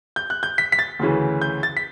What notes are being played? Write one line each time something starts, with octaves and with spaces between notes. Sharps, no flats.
G6
F#6
G6
B6
B6
A6
D2 C#3 E3
G6
A6
B6